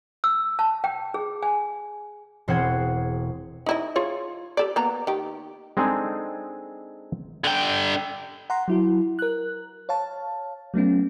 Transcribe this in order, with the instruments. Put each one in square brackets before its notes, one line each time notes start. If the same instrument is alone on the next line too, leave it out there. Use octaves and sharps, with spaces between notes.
[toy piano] E6
A5
G5
G#4
G#5
[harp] E1 C4 G#4 F#5 C6 G#6
[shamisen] D#4 E4 D#5
F4 G#4 C#5
G4 A4 D5
A#3 B3 A#5
D#3 G4
[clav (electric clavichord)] G#3 C4 D4 D#4 G#4 A4
[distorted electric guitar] D3 G5
[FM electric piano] F#5 A#5 C6
F#3 E4 F#4
A#4 F#6
C#5 F5 A5
F#3 A3 B3 C#4